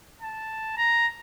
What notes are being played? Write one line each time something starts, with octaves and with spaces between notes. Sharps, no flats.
A5
A#5